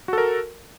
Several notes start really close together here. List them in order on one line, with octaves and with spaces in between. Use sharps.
F#4 A4 A#4